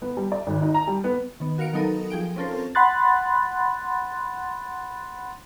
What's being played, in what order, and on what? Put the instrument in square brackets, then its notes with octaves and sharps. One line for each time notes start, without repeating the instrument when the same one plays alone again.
[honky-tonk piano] B3
G3
D5
G#1
D#4
A#5
G3
B3
[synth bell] D#3 B3
F#4 A#4 F5 C#7 D7
F#3 B3 D#4 A4 A#4 D#6
F3 G#4 G5 D7
C4 C#4 F4 A4 A#4 C5
[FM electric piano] F#5 B5 C6 F#6 A6